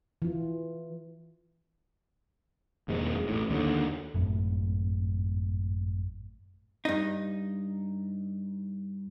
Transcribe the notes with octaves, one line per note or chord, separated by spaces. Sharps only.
E3 F4
E1 D#2 G#2 G#3
A1 A2
D#2 D3
G#1 F#2 A2
G2 D#4